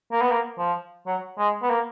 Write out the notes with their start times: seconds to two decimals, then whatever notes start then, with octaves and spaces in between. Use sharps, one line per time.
0.12 A#3
0.22 B3
0.31 A#3
0.58 F3
1.07 F#3
1.38 G#3
1.62 B3
1.70 A#3